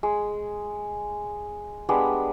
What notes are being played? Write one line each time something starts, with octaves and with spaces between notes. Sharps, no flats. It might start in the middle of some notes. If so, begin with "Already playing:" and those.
G#3
G3 G#3 B3 D4